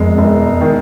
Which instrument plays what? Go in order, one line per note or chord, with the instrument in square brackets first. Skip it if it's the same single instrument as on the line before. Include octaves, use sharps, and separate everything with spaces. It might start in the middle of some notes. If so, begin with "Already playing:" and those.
Already playing: [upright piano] E1 G#3 [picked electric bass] F2
[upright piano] E1
D#3